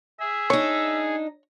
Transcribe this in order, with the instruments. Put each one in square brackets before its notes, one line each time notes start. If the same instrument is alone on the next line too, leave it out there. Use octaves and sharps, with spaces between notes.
[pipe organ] G#4 [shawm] E5
[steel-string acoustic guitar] D4 D#4 [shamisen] C#5